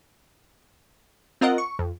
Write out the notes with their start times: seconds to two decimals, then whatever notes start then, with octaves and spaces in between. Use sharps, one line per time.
1.41 C4 F4 A#4 D#5 F#5
1.58 C#6
1.79 F2